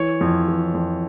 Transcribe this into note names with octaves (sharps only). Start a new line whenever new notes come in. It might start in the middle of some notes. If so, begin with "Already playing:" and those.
Already playing: E3 C#5
F2
E3
F2